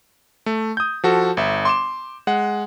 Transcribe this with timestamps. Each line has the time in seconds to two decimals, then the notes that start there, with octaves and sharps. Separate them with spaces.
0.46 A3
0.77 D#6 G6
1.04 F3 F#4 A4
1.37 G1 E5
1.65 C6 D6 E7
2.27 G#3 F#5